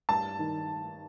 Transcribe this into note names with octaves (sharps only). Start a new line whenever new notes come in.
G2 A5
D#3